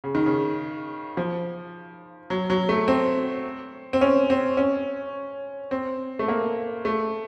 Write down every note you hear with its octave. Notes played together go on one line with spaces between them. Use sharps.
C#3
D#3
C#3
F3
F#3
F#3
A3
C4
C4
C#4
C4
C#4
C4
A3
A#3
A3